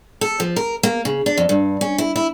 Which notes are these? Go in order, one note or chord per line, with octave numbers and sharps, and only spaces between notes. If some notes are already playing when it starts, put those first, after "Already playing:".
A4
F3
A#4
A#3
C#3
D4
F2
G2
C#4
E4
E4